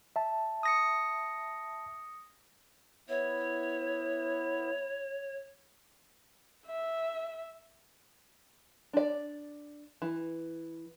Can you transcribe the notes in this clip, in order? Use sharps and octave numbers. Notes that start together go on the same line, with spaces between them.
E5 A5
D#6 A#6 C#7
B3 E4 C#5
E5
D4 D5
E3